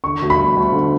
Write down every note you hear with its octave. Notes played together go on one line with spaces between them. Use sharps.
D3 C#6
D2
B5
G3
D2
D3